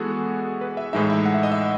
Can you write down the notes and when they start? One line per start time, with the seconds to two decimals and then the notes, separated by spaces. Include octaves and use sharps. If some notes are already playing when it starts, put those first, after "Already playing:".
Already playing: E3 G#3 B3 F#4 G#4 A4
0.61 B4
0.77 E5
0.93 A2 E3 G#3 D#4 E5
1.10 E5
1.25 F#5
1.34 E5
1.43 D#5
1.52 E5